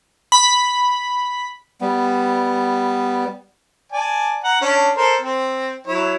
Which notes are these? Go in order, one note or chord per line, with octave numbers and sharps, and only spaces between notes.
B5
G3 B3
D5 G#5 A5
F#5 A#5
C#4 D4
A4 A#4 C5
C4
F#3 E4 C#5